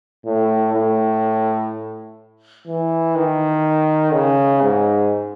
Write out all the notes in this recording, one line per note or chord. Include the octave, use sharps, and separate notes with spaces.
A2
A2
E3
D#3
C#3
G#2